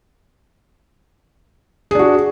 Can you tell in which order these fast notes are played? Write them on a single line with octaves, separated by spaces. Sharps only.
G#4 D4 F#4